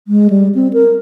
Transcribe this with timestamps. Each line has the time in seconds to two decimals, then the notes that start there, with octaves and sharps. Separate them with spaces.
0.08 G#3
0.30 G3
0.55 C4
0.73 A#4